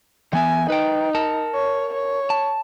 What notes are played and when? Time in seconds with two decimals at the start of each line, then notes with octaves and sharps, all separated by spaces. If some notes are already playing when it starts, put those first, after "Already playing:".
0.33 E3 B3 E5 G#5
0.70 D#4 B4 G5
1.15 A#4 A5
1.55 C#5
1.94 C#5
2.30 A5